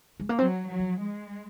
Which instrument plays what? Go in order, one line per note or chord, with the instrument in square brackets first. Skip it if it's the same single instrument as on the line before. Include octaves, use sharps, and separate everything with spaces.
[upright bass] G#3
A#3
[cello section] F#3 [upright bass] C4
[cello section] F#3
[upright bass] F3
[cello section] G#3